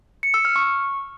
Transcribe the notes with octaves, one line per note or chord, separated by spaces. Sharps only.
C#7
E6
F6
C#6